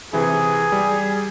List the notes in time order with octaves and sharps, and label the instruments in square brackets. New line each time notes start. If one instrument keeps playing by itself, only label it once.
[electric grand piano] C3 E3 E4 [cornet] G#4
[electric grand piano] G3